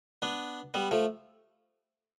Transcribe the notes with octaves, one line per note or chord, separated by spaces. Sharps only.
B3 D4
G3 B3
F3 A3